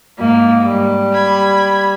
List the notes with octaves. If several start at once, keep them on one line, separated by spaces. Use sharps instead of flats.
G#2 A#3
G3
B5 G#6